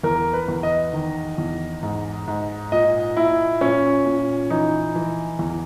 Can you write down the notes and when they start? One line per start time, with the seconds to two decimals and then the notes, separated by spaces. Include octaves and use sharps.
0.03 E2 A#4
0.33 B4
0.48 E2
0.63 D#5
0.93 D#3
1.38 E2
1.83 G#2
2.27 G#2
2.72 A#2 D#5
3.17 A#2 E4
3.61 A#2 C#4
4.06 A#2
4.50 E3 D#4
4.95 E3
5.39 E2